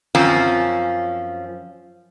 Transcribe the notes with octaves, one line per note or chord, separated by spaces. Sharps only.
F#2 F3 C4 C#4 F4